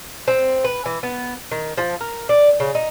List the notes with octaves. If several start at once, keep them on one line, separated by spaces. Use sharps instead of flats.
C4
B4
E3
B3
D#3
F3
A#4
D5
C#3
D#4